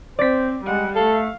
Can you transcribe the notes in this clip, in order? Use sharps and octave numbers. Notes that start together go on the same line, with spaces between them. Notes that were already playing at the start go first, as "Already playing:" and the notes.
C4 C5 D5 B6
G3 G#3 F#5
A3 A4 F5